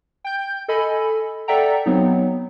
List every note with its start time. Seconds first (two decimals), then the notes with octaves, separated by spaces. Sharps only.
0.24 G5 G6
0.68 A4 D#5 G#5 B5
1.48 A4 D5 E5 F#5 G5 A#5
1.86 F#3 B3 C4 D#4